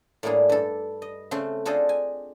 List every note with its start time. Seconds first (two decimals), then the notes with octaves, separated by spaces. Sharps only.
0.23 A2 G3 A#3 D4 G#4
0.49 G2 A4
1.02 D#5
1.31 C#3 A3 C4 C5 C6
1.65 D4 F4 G#4 A4 C5 D#5
1.89 G#5